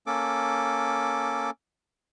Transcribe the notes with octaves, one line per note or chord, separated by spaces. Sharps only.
A#3 C#4 A4 D6